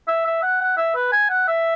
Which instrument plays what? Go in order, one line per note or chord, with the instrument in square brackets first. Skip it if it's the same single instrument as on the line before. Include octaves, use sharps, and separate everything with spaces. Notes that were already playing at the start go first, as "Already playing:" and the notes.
[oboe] E5
E5
F#5
F#5
E5
B4
G#5
F#5
E5